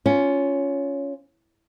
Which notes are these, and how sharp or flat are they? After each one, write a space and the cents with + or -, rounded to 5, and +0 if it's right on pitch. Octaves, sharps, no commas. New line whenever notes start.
C#4 +10 F4 +0